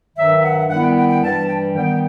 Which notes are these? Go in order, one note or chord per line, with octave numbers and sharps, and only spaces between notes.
G2 D#3 F#3 E5
F#5
D#3 G3 B3 E4 F#5
G5
G5
G5
G2 E3 G3 A5
G5
D#3 G3 B3 G5